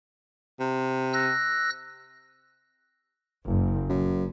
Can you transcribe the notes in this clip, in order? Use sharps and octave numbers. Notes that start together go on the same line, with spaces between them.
C3
E6 F#6 A#6
F#1
F#2